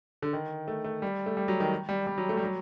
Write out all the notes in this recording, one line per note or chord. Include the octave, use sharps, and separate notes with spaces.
D3
D#3
A3
A3
G3
A3
G3
F#3
D#3
G3
G3
F#3
A3
G3
F#3